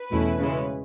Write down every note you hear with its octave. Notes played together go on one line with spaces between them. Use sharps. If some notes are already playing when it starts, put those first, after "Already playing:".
Already playing: B4
E2 B2 A3 C#4 E4
C#3 G#3 C#4 E4